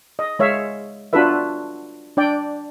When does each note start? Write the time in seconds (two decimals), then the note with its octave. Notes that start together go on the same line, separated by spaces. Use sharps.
0.19 D#5
0.39 G#3 C#5 E5 F5
1.13 D4 F4 F#4 A4 B4 E5
2.17 D4 D5 G5